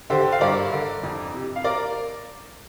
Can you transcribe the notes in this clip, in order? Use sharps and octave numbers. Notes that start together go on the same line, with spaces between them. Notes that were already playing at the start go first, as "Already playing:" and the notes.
D3 G4 C5
F5
G2 A#4 D5
D3
F2
C3
F5
A#4 D5